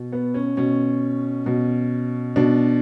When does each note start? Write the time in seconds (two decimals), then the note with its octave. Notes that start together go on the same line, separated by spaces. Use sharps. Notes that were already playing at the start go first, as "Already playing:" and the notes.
Already playing: B2
0.12 B3
0.34 C#4
0.57 B2 C#4
1.46 B2
2.36 B2 D4